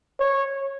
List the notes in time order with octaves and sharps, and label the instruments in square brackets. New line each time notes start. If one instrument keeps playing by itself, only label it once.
[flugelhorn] C#5